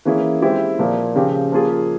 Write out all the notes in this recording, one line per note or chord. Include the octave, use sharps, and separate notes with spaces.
E3 A#3 C#4 E4 G#4
G#3 C4 E4 G4
A#2 F3 A#3
C#3 F3 C4 G4
F3 A#3 F4 G#4